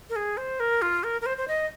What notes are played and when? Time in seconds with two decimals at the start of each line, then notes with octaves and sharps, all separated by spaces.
0.10 A#4
0.16 G#4
0.37 C5
0.60 A#4
0.82 F4
1.04 A#4
1.21 A#4
1.26 C5
1.38 C5
1.48 D#5